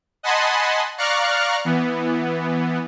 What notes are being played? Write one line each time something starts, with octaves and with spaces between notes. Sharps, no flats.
D#5 F#5 G#5 A5 B5 C6
D5 F5 A#5 C#6 F6 F#6
E3 B3